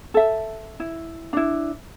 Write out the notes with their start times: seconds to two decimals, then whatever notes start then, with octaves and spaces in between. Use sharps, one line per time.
0.14 A4 E5
0.80 E4
1.33 D4 E4